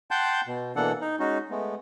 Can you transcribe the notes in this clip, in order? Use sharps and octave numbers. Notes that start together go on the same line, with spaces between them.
F#5 G5 A5 C6 G6
B2
B2 E3 A#3 D4 A4 F#5
D#4
G#3 C#4 D#4 F#4
G#3 A3 B3